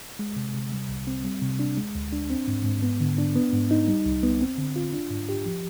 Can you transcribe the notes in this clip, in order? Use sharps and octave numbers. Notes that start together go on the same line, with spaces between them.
G#3
C3
C3
G3
C2
C4
G3
C3
D4
G#3
D2
D4
C4
G#2
G#2
B3
D3
D4
B3
G#2
D#4
G3
C2
B3
C4
D3
F4
D4
G#2
G4
F3